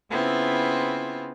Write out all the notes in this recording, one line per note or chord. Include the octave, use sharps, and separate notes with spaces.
C#3 B3 C4 E4 F4